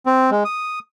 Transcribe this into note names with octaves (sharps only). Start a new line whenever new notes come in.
C4
G#3
D#6